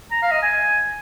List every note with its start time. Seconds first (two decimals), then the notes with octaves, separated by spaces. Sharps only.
0.12 A#5
0.22 F5
0.32 D#5
0.42 G#5